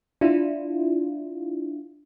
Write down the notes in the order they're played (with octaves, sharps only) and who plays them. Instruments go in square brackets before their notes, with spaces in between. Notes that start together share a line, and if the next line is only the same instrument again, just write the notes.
[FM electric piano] D4 E4 F4